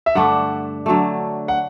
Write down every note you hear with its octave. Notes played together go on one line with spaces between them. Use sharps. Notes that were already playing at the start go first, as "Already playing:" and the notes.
E5
G2 D3 A3 D4 F#5
D3 F#3 A3
F#5